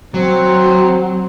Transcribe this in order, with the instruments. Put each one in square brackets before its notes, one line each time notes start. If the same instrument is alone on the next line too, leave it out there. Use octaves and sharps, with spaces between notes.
[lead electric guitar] F#3 [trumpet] C4